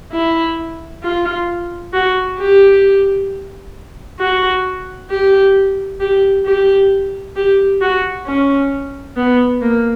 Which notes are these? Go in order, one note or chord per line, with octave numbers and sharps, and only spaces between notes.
E4
F4
F#4
G4
F#4
G4
G4
G4
G4
F#4
C#4
B3
A#3